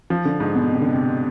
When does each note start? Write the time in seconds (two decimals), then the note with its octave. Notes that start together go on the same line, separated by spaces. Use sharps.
0.10 F3
0.25 D3
0.40 G#2
0.55 B2
0.70 C3
0.81 D3
0.93 C3